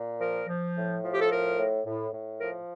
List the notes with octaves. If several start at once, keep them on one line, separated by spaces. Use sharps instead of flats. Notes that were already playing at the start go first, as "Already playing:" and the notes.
Already playing: A#2
F3 A#4
F3
A2
F3
G4
A4
A2 A#4
A2
A2
A2
F3 A#4